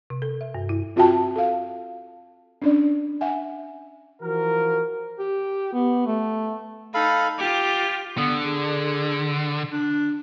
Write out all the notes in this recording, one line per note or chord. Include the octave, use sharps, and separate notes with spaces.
C3
A4
E5
G2
E4
C4 F4 F#4 E5 G5 A5
A4 F5
C#4 D4 D5
E5 F#5 G#5
E3 F3 F#4 A#4
G4
B3
A3
D#4 A4 F5 B5
F4 G4 D6
D3 B3
G#4
D4